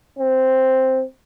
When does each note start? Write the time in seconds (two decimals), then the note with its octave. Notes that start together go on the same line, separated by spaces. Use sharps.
0.19 C4